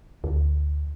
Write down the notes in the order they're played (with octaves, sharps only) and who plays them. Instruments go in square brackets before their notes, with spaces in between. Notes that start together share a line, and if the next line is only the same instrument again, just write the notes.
[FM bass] D2